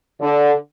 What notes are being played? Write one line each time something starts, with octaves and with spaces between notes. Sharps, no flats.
D3